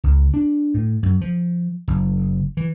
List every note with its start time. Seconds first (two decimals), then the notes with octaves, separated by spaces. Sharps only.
0.04 C#2
0.34 D4
0.74 A2
1.03 F#2
1.21 F3
1.88 F#1
2.57 E3